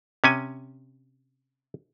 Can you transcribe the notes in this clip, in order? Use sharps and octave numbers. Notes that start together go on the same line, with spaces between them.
C3 C#4 G#5